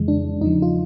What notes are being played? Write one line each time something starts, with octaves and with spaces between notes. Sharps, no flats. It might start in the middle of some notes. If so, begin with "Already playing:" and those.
Already playing: F2 C#3 E3 G#3
D4
E2 C#3 F3 D#4
F4